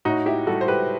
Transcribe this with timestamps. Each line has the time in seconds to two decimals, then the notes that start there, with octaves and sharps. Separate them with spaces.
0.05 A2 D#4 F#4
0.26 E4 G4
0.47 G3 F#4 A4
0.61 C5
0.68 G4 B4